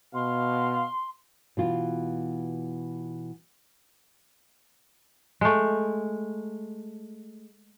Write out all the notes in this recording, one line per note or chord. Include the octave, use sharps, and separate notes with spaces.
B2 F5 C6
B2 E3 F4
G#3 A3